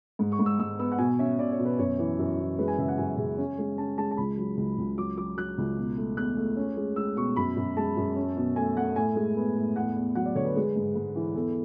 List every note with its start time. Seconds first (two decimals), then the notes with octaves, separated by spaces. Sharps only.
0.19 G#2
0.32 C#6
0.39 G#2
0.46 E6
0.59 G#2 E6
0.79 B3 E6
0.92 F#5
0.98 B2 G#5
1.19 C#4 E5
1.39 B2 D5
1.52 C#5
1.59 B2
1.65 B4
1.79 F#2 C#5
1.99 E3
2.19 F#2
2.39 E3
2.58 G#3 B4
2.68 G#5
2.78 C#3 E5
2.88 F#5
2.98 F#2 G#5
3.18 C#3
3.38 C#4
3.58 G#3
3.78 C#4 A5
3.97 G#3 A5
4.11 A5
4.17 C#2 B5
4.38 F#3
4.57 C#2
4.78 C#2
4.97 F#3 D6
5.17 F#3 D6
5.37 F#3 F#6
5.58 C#2
5.77 B2
5.97 A3
6.17 E2 F#6
6.37 A3
6.57 C#4
6.77 G#3
6.96 G#3 E6
7.16 B2 C#6
7.36 F#2 B5
7.56 F#2
7.77 G#3 A5
7.97 F#2
8.16 C#4
8.37 B2
8.56 A3 G#5
8.77 A3 F#5
8.96 A2 G#5
9.16 G#3
9.36 B3
9.56 A2
9.76 E2 F#5
9.96 E2
10.15 F#3 F#5
10.26 D5
10.35 D3 C#5
10.45 B4
10.56 G#3
10.76 G#2
10.95 G#2
11.16 E3
11.35 E2 A4